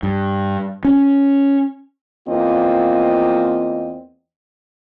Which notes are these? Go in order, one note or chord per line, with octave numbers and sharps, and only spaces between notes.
G2
C#4
E2 A#3 C4 F4 D#5